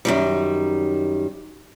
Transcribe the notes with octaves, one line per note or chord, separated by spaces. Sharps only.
F#2 D#3 G3